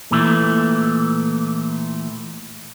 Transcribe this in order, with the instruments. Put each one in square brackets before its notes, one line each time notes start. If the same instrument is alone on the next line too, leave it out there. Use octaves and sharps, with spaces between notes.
[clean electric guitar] A#2 E3 A3